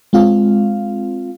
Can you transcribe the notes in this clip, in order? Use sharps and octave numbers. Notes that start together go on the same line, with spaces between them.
G#3 C4 F4 F5